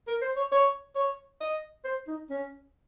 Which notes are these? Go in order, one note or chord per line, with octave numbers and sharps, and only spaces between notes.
A#4
C5
C#5
C#5
C#5
D#5
C5
D#4
C#4